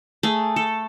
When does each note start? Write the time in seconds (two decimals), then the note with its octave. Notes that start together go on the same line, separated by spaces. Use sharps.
0.23 A3 G#4
0.56 A4